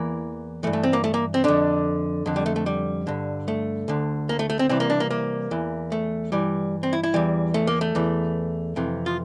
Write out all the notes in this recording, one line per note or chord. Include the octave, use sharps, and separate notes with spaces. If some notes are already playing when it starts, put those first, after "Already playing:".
Already playing: E2 E3 A#3
G2 E3 A3
A3
C4
A#3
A3
A#3
C4
F2 D3 D4
F2 D3
G3
A3
A3
G3
G2 D3
A3
D2 D3
A#3
A3
A3
C4
C2 C3 E3 C4
A#3
D4
A#3
A#3
E2 E3
A3
G2 E3 G3
C4
E4
E4
E2 E3 G3
A3
A#3
A3
E2 E3
F2 C3 E3
F4